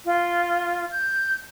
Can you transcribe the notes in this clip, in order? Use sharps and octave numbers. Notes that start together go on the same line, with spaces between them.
F4
G6